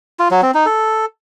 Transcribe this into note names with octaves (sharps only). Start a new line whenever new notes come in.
F4
F#3
C4
D#4
A4